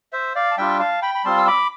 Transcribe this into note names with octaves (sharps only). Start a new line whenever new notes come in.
C5 E5
D5 F5
A5
G3 D4 F4 E5 G5
F5 A5
G5 B5
B5
G3 C4 F4 A5 C6
E6
B5 D6